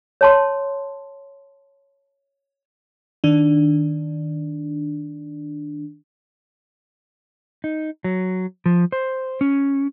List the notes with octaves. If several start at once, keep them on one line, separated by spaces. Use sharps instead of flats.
C#5 A5 C6
D#3 D4
D#4
F#3
F3
C5
C#4